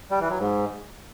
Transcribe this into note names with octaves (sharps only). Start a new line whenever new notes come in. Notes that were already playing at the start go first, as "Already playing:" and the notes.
G3
E3
F#3
G#2